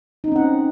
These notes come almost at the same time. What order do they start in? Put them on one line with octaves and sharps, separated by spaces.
D#4 C#4 C4 F#5